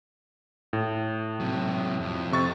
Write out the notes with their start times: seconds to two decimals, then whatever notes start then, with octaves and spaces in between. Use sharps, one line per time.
0.73 A2
1.40 C3 F#3
2.00 F2
2.32 C3 C#6 A6